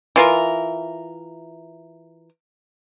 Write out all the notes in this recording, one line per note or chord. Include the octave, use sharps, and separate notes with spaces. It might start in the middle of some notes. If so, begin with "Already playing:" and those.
E3 F4 A#4